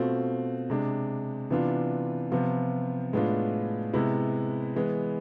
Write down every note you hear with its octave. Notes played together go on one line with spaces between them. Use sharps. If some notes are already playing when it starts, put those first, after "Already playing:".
Already playing: B2 A3 C4 F4
C3 G#3 D4
C3 E3 B3 D4 F4
C3 F3 B3 F4
A2 G#3 B3 D4 F4
C3 G#3 B3 E4
E3 G#3 B3